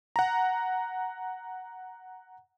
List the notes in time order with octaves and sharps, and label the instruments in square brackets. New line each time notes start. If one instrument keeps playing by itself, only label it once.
[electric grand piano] F#5 A#5